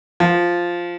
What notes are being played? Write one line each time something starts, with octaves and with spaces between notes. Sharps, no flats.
F3